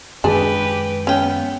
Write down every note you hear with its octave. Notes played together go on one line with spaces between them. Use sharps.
F#2 D#3 G#3 D4 G4 G#4 B4
B3 C#4 F5 G5